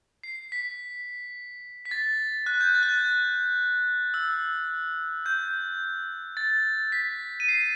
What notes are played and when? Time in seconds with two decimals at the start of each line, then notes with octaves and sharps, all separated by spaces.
0.23 C7
0.52 B6
1.85 B6
1.91 A6
2.46 F#6
2.61 G6
2.75 A6
2.83 F#6
2.89 G6
4.14 E6
5.26 G6
6.37 A6
6.92 B6
7.40 D#7
7.49 C7